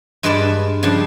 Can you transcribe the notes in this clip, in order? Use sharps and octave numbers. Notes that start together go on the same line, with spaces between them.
G2 G#3 F4 B4 D5 A5
C#3 F3 G3 D4